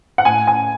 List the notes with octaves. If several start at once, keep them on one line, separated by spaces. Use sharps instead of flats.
F#5
A2 G#5
G#5